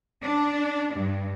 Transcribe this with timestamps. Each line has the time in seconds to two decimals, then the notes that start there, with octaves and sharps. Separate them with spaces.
0.22 D4
0.95 G2